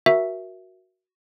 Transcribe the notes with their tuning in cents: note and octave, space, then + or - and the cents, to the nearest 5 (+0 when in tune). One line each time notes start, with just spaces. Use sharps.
F#4 +0 A#4 +20 E5 +5